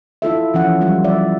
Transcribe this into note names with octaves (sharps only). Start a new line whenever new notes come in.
E4 F4 A4 E5
E3 F3 C#4 F#5
F#3 G3 F4
G3 D5 E5